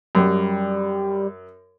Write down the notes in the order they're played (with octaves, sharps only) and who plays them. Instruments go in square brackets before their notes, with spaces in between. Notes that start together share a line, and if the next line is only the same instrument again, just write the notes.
[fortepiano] F#2 [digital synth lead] G3